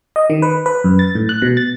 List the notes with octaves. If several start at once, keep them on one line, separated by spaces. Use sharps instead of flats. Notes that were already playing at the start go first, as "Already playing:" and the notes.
D#5
D#3
B4
B4
F#2
A6
A2
F#6
B2
A6